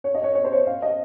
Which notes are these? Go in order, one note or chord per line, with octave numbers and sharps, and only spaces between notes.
C#5
D#5
C#5
C#5
C5
C#5
F5
D#5